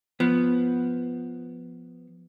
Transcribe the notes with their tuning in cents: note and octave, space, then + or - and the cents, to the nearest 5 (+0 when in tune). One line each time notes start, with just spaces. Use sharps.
F3 +0 B3 +0